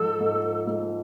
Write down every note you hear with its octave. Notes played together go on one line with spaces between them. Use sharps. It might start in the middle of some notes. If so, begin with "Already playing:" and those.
Already playing: G#2 F3 A4
G#2
G#2